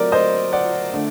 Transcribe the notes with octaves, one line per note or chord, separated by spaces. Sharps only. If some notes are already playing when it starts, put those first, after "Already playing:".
Already playing: F#3 A3 C4 A#4 D5
C5 D#5
D5 F#5
D3 A3